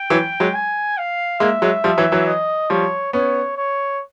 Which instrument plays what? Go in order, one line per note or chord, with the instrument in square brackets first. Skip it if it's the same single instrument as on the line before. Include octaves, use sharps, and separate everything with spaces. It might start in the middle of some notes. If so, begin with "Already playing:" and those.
Already playing: [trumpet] G5
[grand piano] E3 F#3
F#3 G#3
[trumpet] G#5
F5
[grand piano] G#3 A#3 [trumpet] E5
[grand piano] F#3 G#3
F3 G3
E3 F#3
E3 F#3
[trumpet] D#5
[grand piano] F3 G3 [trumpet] C#5
[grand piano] B3 C#4 [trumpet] C#5
[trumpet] C#5